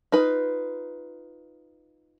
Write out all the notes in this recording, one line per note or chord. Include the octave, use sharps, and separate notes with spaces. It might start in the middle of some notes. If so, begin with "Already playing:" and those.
D#4 F4 B4